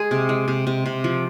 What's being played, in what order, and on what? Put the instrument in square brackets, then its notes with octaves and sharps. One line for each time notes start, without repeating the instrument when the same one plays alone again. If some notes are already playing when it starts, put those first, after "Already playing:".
Already playing: [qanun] G#3 G#4
C3
G#3
C3
C3
C3
F3